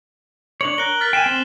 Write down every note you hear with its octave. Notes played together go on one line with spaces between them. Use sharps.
D4 C#5 F#7
A#4 F#6 G7
F6 A6 B6
G5 G#5 C7 E7
C4